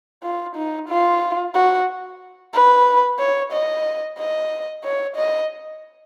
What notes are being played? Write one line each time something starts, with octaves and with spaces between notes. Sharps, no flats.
F4
D#4
F4
F#4
B4
C#5
D#5
D#5
C#5
D#5